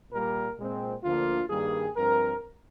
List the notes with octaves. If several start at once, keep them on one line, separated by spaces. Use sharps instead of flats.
A#2 G3 A#3 A#4
A#2 G#3 C4
D2 D3 F3 A#3 F4
G2 D#3 G3 A#3 G#4
G2 F3 C4 A#4